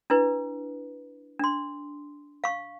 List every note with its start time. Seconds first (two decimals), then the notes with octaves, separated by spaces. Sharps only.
0.10 D4 E4 B4
1.39 D4 C6
2.44 F5 C#6